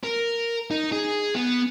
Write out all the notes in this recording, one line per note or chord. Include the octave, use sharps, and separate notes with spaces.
A#4
D#4
G#4
B3